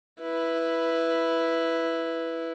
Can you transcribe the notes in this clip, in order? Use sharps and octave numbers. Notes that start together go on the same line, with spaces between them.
E4 B4